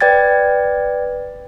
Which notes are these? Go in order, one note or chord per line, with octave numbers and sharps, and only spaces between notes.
B4 D5 G5 G#6 A6